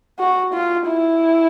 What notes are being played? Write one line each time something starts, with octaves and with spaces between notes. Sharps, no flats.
F#4
F4
E4